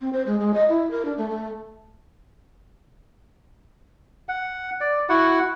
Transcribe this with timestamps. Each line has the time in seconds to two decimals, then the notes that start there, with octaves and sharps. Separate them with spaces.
0.01 C4
0.13 C5
0.27 G#3
0.40 G#3
0.54 D#5
0.69 E4
0.91 A#4
1.05 D4
1.18 A3
1.30 A3
4.29 F#5
4.81 D5
5.09 E4 F#4 F#5